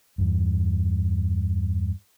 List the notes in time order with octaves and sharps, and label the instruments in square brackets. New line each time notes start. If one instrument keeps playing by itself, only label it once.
[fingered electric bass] E2 G2